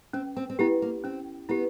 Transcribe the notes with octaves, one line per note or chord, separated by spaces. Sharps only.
C4 C#4
C4
C4
B3 E4 G4
A#3
C4 C#4
B3 E4 G4